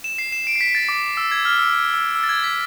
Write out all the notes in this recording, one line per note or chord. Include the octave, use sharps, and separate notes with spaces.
E7
C7
E7
D7
C7
B6
A6
D6
E6
G#6
F6
E6
E6
E6
E6
A6
G#6
B6